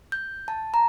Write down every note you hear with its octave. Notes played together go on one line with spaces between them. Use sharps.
G6
A5
A#5